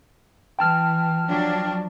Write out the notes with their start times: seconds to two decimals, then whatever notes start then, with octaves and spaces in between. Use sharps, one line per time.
0.59 E3 G5 A5 F6
1.27 F3 F#3 D4